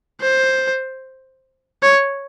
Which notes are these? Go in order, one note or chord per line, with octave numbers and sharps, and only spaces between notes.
C5
C#5